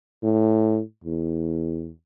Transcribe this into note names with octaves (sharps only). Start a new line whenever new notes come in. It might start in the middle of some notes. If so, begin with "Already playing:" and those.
A2
E2